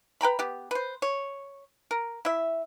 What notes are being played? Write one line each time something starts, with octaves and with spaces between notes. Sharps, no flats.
B4 G5 A#5 B5
B3 G4
B4 C5
C#5
A#4
E4 E5